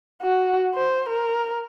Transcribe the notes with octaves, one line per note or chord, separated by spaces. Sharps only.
F#4
C5
A#4